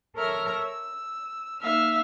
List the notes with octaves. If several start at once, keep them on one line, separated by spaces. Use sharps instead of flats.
A4 A#4 C#5 E5 A#5 F6
E6
A#3 D#4 E5 F5 E6